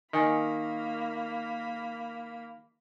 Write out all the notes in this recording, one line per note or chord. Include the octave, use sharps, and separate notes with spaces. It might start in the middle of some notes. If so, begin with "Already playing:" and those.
D#3 A#3 D#5 G#5 B5